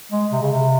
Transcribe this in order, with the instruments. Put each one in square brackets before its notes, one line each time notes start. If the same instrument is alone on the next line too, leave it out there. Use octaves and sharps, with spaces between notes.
[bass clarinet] G#3
C3
C#3
C3